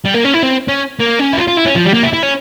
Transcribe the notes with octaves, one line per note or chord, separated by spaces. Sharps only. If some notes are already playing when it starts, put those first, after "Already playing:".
G3
A#3
C#4
E4
C4
C#4
A#3
C#4
E4
F4
F4
E4
C#4
F3
G3
A#3
E4
E4
C#4